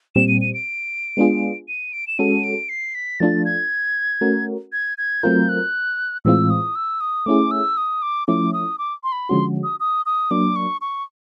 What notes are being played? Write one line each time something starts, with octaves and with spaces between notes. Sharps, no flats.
A#2 G3 C4 E7
D#7
D#7
D7
G#3 B3 D4 F4 G#4
D#7
D7
E7
G#3 C#4 F#4 A4 D#7
D7
C7
B6
F3 A3 D4 F4 A4 A6
G#6
A3 C#4 F#4 A#4
G#6
G#6
F#3 A3 C4 F4 A#4 G6
F#6
A2 E3 G#3 C4 F4 E6
D#6
E6
D#6
A3 C#4 E4 G#4 D6
E6
D#6
D6
F3 A3 C#4 E4 D6
D#6
D6
C6
B5
D3 F3 G#3 C#4 F#4 C6
D#6
D#6
D#6
F#3 A#3 D4 D6
C#6
C#6